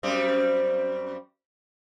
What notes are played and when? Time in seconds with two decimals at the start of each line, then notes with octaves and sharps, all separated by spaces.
0.03 F#2 G3 C4